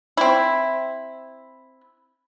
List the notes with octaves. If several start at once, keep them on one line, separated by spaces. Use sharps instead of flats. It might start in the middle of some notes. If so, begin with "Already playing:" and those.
C4 E4